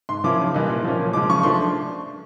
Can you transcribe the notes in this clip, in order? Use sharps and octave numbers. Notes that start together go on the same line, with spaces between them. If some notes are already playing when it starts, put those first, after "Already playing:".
G#2 C6
F3 A#3 C#4 E4 D6
C#3
E3 G3 A#3 D#4
A#2
F3 A#3 C#4
A#2
F3 G#3 D6
C#3 C#6
F3 A3 D4 C6